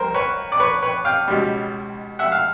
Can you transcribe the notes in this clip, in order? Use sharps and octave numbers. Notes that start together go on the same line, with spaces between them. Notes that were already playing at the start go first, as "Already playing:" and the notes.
Already playing: C2 A#4 C5
B4 C#5
D5
B4 C#5
B4 C#5
F5 G5
C#2 B2 G3
E5 F#5
F5